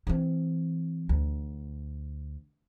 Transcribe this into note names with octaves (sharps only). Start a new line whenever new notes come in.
E3 C4
D2